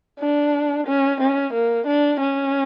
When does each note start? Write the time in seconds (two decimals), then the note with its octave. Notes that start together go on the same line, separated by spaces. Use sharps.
0.20 D4
0.87 C#4
1.20 C#4
1.53 A#3
1.87 D4
2.20 C#4